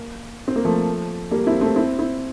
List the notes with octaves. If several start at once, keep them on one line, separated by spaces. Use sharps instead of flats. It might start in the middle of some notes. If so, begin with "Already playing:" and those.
Already playing: A#3
C4
A#3
F3 A3
G3 A#3
C4 E4
A3 C4
C4 E4
C4 E4